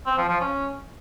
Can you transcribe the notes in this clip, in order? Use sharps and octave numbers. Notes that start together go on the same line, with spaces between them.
C4
F3
F3
C#4